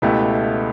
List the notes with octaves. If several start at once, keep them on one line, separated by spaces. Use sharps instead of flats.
C#2 B2 A3 E4 G4